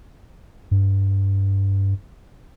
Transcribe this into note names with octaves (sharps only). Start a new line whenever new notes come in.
G2